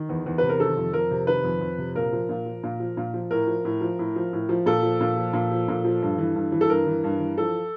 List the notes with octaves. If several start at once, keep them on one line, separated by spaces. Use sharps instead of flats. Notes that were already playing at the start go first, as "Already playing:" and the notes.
Already playing: D#3
E2
E2
C3 B4
A#4
D#3 A4
F2
F2 A#4
C3
D#3 B4
F2
F2
C3
A#2 A#4
F3
A#2
F3
A#2
F3
A#2
F3
A2 A#4
F3
A2
F3
A2
F3
A2
F3
A#2 A4
F3
A#2
F3
A#2
F3
A#2
F3
G2
E3
G2
E3
A4
G2 A#4
E3
G2
E3
F3 A4